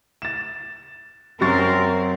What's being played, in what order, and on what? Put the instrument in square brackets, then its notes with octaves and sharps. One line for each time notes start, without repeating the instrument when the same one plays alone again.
[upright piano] A6 E7
[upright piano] F#2 C#6 A6 [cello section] C4 A#4